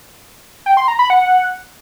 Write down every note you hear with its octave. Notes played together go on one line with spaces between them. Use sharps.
G5
C6
A#5
B5
F#5